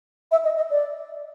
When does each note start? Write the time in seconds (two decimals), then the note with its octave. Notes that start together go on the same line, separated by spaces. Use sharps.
0.31 E5
0.44 D#5
0.56 D#5
0.70 D5